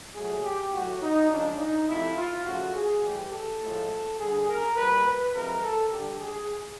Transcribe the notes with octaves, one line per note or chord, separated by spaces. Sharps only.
A#2 F#3 A3 G#4
G4
A2 F#3 A3 F#4
D#4
C#3 F3 G#3 D4
D#4
C3 F3 A3 E4
F4
C#3 F3 A3 F#4
G#4
A2 E3 G3 G4
A4
A2 F3 G#3
D3 G3 G#4
A#4
A#2 G3 B4
B4
C3 F3 G#3 A#4
A4
D3 G3 G4
G#4